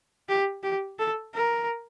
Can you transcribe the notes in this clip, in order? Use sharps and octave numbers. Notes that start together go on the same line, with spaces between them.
G4
G4
A4
A#4